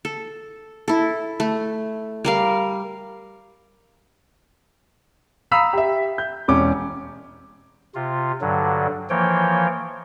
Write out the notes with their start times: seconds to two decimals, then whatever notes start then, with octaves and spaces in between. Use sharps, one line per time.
0.05 A4
0.88 E4 A4
1.40 A3
2.24 G3 A#4 F5
5.51 F5 A#5 B5 D#6 E6 B6
5.73 G4 E5
6.18 G6
6.48 E1 C#4 D6
7.95 C3 F4
8.41 G2 D3 F#3
9.10 E3 F3 A#3 C#5 G5